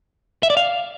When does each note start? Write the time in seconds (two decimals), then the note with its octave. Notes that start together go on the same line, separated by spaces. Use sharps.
0.43 E5
0.50 D5
0.57 F5